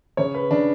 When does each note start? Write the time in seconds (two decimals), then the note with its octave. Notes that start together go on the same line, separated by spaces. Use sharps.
0.17 C#3 C#5
0.34 B4
0.51 C#3 D4